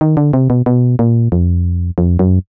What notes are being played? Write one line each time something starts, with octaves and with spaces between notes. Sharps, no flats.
D#3
D3
C3
B2
B2
A#2
F2
F2
F#2